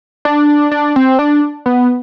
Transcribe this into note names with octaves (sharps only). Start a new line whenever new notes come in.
D4
D4
C4
D4
B3